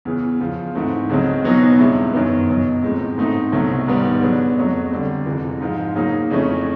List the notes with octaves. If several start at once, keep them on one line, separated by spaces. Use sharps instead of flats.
E2 C#3 E3
E2 C#3 F3
G#2 E3 A3 C4
C#2 C#3 F#3 A3 C4
E2 B2 F#3 B3 D#4
G2 E3 G#3 C4 E4
F#2 D#3 F#3 B3
C#2 B2 F#3
A2 E3 G#3 C4
G#2 E3 A3 C4 D#4
C2 B2 F#3 A3
G#2 D#3 G3 B3
C#3 F#3 B3 D4
F2 C#3 F#3 A3
D3 G3 C4
F2 C3 E3 G#3
G#2 F3 G#3
C#3 F#3 A#3 D#4
F2 C#3 E3 A3 C#4